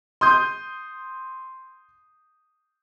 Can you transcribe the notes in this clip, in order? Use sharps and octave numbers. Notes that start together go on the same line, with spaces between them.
C6 D#6 G6